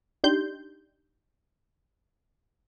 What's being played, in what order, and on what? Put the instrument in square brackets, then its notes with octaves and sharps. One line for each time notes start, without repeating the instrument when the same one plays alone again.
[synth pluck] D4 D#4 G4 C6 G6